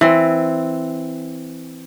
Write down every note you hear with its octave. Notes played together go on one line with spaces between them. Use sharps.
E3 C4